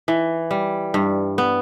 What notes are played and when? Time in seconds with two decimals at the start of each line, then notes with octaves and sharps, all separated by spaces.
0.08 E3
0.51 G3
0.94 G2
1.38 B3